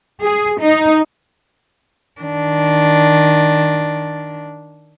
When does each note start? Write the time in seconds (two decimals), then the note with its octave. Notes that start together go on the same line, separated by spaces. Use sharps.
0.24 G#4
0.60 D#4
2.21 D#3 D4